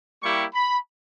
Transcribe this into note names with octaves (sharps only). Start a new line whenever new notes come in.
G3 A#3 E4 G4 C#6
B5